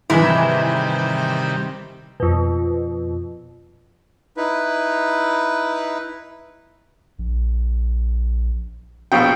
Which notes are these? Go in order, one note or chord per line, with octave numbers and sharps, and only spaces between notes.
G#2 C3 D#3 E3 G3 E4
F2 B2
D#4 E4 B4
A#1
A#1 B2 G5